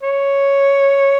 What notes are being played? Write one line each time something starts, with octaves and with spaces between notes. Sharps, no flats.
C#5